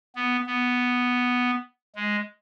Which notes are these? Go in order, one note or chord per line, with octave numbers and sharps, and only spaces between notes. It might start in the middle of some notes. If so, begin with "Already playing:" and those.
B3
B3
G#3